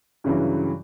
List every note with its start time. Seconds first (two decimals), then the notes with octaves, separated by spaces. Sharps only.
0.24 G2 C#3 E3 F#3